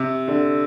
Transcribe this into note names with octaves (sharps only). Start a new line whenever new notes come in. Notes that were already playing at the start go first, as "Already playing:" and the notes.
Already playing: C3
D3